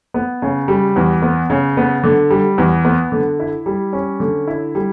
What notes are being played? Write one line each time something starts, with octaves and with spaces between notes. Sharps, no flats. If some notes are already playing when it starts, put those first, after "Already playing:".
B3
C#3
G3
E2
B3
C#3
B3
D3
G3
E2
B3
D3
E4
G3
C#4
D3
E4
G3